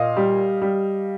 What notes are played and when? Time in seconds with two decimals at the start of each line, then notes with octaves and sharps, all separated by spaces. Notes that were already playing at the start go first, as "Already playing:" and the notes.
Already playing: A#2 D#5 F5
0.17 G3
0.62 G3